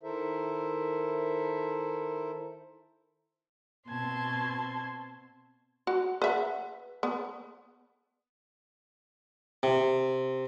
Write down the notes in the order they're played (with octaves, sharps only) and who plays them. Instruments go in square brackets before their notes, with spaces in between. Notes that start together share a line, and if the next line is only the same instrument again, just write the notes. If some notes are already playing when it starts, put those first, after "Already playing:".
[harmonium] D#3 E4 A4 A#4 C5 E5
[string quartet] B2 C4 A5 C6 G#6
[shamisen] F#4
B4 E5 F#5
B3
[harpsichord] C3